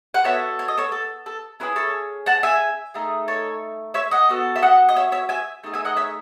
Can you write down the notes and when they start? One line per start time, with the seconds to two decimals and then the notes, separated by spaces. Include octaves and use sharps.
0.14 F#5
0.24 B3 F#4 A4 C#5 E5
0.59 C#5
0.68 D#5
0.77 A4 C#5
0.92 A4
1.26 A4
1.60 C#4 E4 G#4 B4
1.76 A4 C#5
2.26 F#5 A5
2.43 E5 G#5
2.94 A3 D#4 G#4
3.28 A4 C#5
3.94 C#5 E5
4.11 D#5 F#5
4.29 B3 F#4 A4
4.56 E5
4.62 D#5 F#5
4.89 D#5
4.96 C#5 E5
5.12 C#5 E5
5.29 E5 G#5
5.64 A3 D#4 G#4
5.74 E5 G#5
5.85 D#5 F#5
5.96 C#5 E5